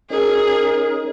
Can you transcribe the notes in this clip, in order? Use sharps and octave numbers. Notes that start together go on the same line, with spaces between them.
C#4 D#4 G#4 A#4